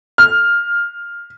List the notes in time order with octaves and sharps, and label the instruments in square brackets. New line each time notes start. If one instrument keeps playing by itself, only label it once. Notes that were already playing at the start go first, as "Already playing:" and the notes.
[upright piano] F6